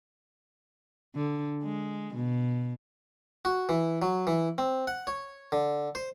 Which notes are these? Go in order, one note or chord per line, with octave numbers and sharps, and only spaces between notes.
D3
G#3
B2
F#4
E3
F#3
E3
C4
F#5
C#5
D3
C5